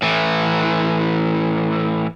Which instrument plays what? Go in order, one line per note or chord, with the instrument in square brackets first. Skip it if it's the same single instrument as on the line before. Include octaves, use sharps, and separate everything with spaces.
[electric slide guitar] A2 E3